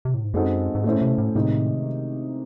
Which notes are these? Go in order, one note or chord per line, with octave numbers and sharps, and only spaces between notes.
C3
A2
G#2
F#2 G#3 C4 D#4 F#4 A4
G#2
A2 A3 C#4 E4 C5
C3
A2
A2 C3 D#3 G#3 D#4